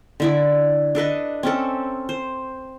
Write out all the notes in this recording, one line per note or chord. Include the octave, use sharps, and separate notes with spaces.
D3 E4 D5
D4 A4 B4 D#5
C4 C#4 A4
C5